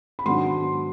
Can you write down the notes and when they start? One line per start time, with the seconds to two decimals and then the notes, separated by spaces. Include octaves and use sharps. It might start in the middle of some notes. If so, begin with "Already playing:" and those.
0.19 B5
0.26 G#2 D#3 F#3 B3 D4 C6